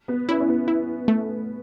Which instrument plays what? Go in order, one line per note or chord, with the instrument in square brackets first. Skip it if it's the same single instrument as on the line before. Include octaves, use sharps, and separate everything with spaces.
[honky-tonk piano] B3
[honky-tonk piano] C#4 [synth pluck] E4
[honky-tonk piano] C#4
B3
[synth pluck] E4
A3